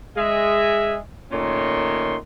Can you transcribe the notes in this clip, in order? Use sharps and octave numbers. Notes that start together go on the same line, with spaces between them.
G#3 G#4 E5
A#2 D#3 A3 C#4 C#5 C6